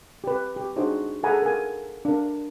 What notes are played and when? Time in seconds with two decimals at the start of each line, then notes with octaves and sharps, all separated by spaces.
0.24 G4 B4
0.56 G4
0.76 D4 D#4 F#4 G#4 C5
1.23 G#4 A4 F#5 G#5 A#5 B5
1.42 A#4 G#5
2.05 D4 A#4